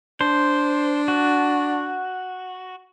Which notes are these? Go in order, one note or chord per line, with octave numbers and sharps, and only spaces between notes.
D4 C5
F#4